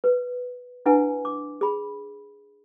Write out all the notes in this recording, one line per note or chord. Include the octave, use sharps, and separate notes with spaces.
B4
D4 E4 B4 F#5 G#5
D6
G#4 B5